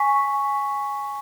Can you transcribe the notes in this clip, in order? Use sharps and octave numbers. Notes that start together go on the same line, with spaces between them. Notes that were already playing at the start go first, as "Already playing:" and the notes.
Already playing: G#5 C#6 B6